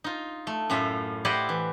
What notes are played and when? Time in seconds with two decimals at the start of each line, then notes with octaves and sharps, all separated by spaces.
0.04 D#4 F4
0.47 A3
0.70 F#2 A2 C#4 F4 E5
1.25 E4 G4 C5 D5 D#5 F#5
1.49 E3